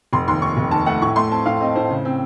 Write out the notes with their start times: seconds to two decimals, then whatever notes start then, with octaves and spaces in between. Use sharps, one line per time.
0.13 F1 C6
0.28 D#2 C6
0.41 D#2 C#6
0.57 F1
0.71 D#2 A5
0.86 A3 F#5
1.01 A2 C#6
1.16 A3 C6
1.31 C4 A5
1.46 A2 F5
1.61 C4 D#5
1.75 A2 C5
1.90 C#3
2.05 C4